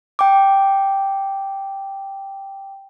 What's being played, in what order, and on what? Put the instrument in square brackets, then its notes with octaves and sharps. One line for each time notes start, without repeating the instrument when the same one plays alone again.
[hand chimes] G5 D6